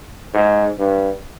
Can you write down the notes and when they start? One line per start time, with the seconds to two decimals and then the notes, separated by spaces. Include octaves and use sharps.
0.34 G#2
0.79 G2